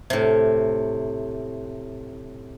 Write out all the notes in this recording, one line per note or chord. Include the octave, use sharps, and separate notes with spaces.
A2 C3